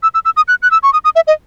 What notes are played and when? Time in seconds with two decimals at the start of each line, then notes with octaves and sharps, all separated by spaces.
0.03 E6
0.14 E6
0.25 E6
0.37 D#6
0.48 F#6
0.62 F#6
0.71 E6
0.83 C#6
0.93 D#6
1.05 D#6
1.16 E5
1.27 D#5